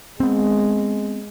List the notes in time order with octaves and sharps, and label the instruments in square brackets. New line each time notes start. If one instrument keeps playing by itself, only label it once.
[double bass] G#3 [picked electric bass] B3 C4